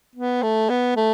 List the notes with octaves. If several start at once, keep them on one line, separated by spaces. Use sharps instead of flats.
B3
A3
B3
A3